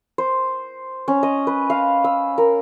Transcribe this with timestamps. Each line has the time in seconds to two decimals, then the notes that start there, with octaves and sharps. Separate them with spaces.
0.18 C5
1.08 C#4
1.23 D#5
1.47 B4
1.70 F5
2.04 E6
2.38 A#4